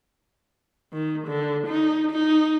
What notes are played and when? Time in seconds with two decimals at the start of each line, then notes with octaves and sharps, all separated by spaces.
0.93 D#3
1.27 D3
1.67 D#4
2.11 D#4